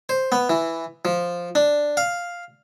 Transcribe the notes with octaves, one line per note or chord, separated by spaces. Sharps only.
C5
B3
E3
F3
D4
F5